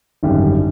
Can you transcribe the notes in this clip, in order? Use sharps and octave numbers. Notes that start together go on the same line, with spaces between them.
G#1 F#2 D3 G3